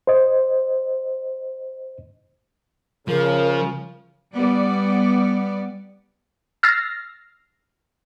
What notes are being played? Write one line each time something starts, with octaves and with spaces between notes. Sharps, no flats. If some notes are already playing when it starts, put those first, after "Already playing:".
C5 D#5
C#3 F3 A#4
G3 B3 D5
E6 F6 A6 A#6 C7